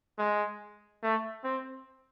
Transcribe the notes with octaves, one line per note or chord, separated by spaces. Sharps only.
G#3
A3
C4